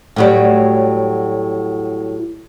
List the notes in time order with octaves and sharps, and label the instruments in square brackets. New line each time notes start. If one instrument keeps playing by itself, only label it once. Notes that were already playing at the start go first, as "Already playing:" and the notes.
[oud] A2 F#3 G3